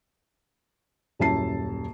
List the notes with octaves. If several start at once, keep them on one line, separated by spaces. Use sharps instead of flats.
D#1 F#2 E4 A5 C7